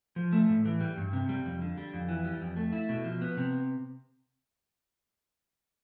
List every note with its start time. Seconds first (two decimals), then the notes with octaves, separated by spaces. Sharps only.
0.16 F3
0.33 A3
0.49 A2
0.65 E3
0.80 G3
0.97 G2
1.13 C3
1.29 G3
1.46 F2
1.62 D3
1.78 G3
1.94 F2
2.09 E3
2.25 G3
2.42 F2
2.57 A3
2.72 E4
2.89 B2
3.04 F3
3.22 B3
3.37 C3